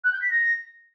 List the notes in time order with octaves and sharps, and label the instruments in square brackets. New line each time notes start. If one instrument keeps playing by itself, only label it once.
[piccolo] F#6
G6
B6
A#6